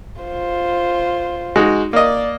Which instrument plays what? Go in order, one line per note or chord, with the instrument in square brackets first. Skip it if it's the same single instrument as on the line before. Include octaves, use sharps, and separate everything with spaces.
[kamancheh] F4 C5
[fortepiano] G#3 D#4 F#4
[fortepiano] A#3 D#5 [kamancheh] D5